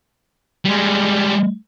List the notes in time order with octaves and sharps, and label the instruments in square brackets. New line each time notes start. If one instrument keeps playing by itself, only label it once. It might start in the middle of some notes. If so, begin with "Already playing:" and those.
[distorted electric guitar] G3 G#3